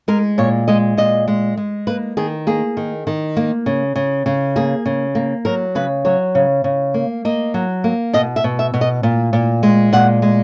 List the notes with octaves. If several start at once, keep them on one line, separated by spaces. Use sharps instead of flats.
G#3 A#4
A#2 C#5
G#3 D#5
A#2 D#5
G#3
G#3
A#3 B4
D#3 G#4
A#3 G#4
D#3
D#3
A#3
C#3
C#3
C#3
A#3 G#4
C#3
A#3
F#3 A#4
C#3 B4
F#3 C#5
C#3
C#3
A#3
A#3 D#5
F#3
A#3
B2 D#5
E5
B2
E5
B2
D#5
A#2
A#2
G#3
A#2 F#5
G#3